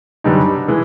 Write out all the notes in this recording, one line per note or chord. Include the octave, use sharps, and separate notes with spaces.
F#2 D3 G3 B3 D#4
E3 G#3